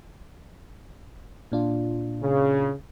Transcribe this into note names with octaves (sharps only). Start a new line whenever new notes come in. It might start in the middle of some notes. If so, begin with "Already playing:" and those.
A#2 D4 F4
C#3